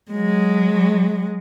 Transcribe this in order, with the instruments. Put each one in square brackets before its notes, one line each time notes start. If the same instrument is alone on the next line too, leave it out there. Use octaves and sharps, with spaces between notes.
[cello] F#3 G#3